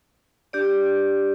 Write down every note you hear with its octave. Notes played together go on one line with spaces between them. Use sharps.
D4 G4 D5